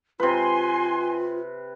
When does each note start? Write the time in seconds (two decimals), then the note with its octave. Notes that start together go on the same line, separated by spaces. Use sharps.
0.20 C3 F4 B4 G#5 C6